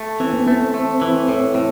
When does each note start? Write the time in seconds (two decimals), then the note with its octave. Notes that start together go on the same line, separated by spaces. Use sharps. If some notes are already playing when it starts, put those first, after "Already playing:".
Already playing: A3
0.20 E3 C4
0.34 B3
0.47 A3 C4
0.74 A3
1.02 E3
1.28 A2
1.55 A2